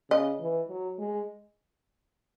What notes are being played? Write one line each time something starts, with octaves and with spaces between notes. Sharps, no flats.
C#3 D#5
E3
F#3
G#3